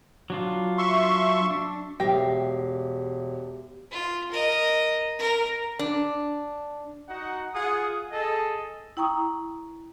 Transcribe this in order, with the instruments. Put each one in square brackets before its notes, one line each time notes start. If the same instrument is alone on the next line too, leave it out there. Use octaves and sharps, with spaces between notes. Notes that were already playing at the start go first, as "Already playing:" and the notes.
[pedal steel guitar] F#3 D4 F4
[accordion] E5 C6 C#6
[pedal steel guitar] D4
[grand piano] E1 A#6 [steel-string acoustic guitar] G4 E5 F5 [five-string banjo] G5
[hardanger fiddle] F4
A#4 D#5
A#4
[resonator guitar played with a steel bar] D4
[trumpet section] D#4 F#4 F#5
F4 G#4 F#5 D#6
G#4 A4 D#5
[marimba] E4 G5 A#5 C#6 D#6